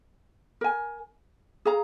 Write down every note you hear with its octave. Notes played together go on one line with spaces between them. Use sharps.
A#4 G#5
G#4 F5 A#5